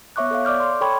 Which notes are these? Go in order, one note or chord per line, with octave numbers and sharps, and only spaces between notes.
B3 C#5 E5 C#6 D6 F#6
A4 C#5 F5
D5 D6 F6 G6
C6
A4 C#5 G5 B5 C#6 G#6